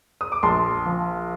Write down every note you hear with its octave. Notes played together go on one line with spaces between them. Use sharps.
D#6
D6
A#1 A5 C6
F3